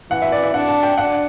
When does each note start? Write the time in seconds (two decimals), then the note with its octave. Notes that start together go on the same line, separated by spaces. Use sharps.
0.11 E3 F#5
0.22 E5
0.32 D5
0.43 E5
0.54 D4 F#5
0.69 A5
0.83 G5
0.97 D4 F#5